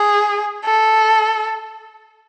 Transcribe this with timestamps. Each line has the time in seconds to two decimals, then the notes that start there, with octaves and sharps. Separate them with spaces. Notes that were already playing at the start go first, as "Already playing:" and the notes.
Already playing: G#4
0.65 A4